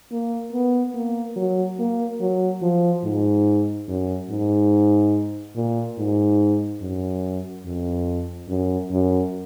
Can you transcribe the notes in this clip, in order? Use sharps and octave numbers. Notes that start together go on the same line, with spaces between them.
A#3
B3
A#3
F#3
A#3
F#3
F3
G#2
F#2
G#2
A#2
G#2
F#2
F2
F#2
F#2